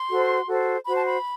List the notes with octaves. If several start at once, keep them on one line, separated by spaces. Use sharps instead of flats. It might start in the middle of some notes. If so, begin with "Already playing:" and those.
Already playing: C6
F#4 A4 C5
F#4 A4 C5
F#4 C5 B5
A5
B5